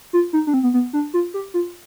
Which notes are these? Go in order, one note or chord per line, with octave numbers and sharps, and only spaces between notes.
F4
D#4
D4
C4
B3
B3
D4
F4
G4
F4